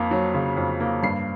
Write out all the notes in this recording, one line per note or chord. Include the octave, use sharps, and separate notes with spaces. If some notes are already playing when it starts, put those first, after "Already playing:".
Already playing: F2 A#3
F#3
C#3
F2
A#3
G2 C7